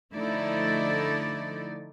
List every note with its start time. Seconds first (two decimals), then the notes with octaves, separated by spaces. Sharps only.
0.13 D3 F3 A3 D#4 E4 D5